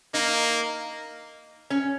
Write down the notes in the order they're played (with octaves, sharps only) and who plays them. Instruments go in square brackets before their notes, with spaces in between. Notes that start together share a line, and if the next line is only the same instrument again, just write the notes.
[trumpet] A#3 [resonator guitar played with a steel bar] D#4
[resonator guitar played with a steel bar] C#4